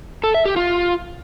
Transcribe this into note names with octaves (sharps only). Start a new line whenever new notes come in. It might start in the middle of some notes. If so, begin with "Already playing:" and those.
A4
E5
G4
F4